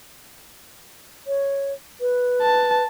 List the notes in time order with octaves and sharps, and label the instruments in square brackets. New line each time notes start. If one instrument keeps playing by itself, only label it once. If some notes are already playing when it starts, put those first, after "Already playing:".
[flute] C#5
B4
[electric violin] A5